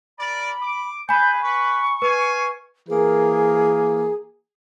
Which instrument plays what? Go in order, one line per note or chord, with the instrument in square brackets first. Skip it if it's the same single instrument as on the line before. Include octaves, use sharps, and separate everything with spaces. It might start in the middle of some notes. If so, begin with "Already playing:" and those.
[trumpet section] A#4 D5 [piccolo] B5
[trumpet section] D6
[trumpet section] G#4 B4 [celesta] G#5 B5 [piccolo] G6
[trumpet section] B4 [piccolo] C#6
[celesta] B4 [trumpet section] F5 G#5
[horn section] E3 A#3 A#4 [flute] G#4